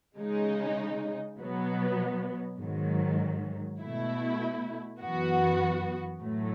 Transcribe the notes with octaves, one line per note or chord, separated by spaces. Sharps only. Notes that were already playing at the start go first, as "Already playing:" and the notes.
C#3 G#3 D#4
B2 F#3 B3
G#2 D#3 F#3
B2 A3 E4
F#2 E3 B3 F#4
A2 F#3 A3